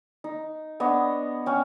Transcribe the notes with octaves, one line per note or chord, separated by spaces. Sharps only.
D#4
B3 D4 C#5 D#5
C#4 G5